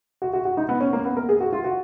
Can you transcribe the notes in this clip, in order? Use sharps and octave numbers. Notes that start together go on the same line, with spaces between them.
F#4
F#4
F#4
D#4
B3
C#4
A#3
B3
A#4
G#4
F#4
F4
F#4